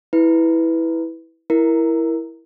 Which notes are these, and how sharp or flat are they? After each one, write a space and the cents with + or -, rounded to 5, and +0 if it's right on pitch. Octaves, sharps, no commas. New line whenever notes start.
E4 -10 B4 +0
E4 +0 A#4 +10